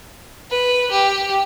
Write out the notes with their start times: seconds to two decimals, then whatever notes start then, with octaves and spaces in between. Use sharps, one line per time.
0.50 B4
0.91 G4